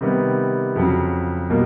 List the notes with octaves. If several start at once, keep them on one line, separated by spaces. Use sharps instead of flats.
C3 D#3 G3 B3
F2 C#3 F#3
B2 G3 A#3